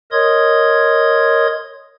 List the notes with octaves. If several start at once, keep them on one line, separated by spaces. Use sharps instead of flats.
A#4 C#5 D#5 C6 D#6 G#6